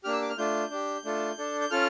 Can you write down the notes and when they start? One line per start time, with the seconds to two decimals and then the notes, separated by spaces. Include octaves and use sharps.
0.04 A#3 D4 G4 F6
0.13 E6
0.22 D6
0.29 F6
0.38 A3 D4 F4 G6
0.71 D4 G4
1.05 A3 D4 F4 A4
1.38 D4 A4
1.61 G6
1.71 C#4 F4 A4 F6